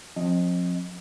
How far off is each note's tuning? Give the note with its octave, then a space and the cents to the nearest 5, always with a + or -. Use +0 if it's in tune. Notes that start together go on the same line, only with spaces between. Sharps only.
F3 +25 C4 +30 D#5 +0